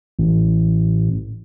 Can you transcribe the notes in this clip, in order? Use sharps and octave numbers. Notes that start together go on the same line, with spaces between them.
A1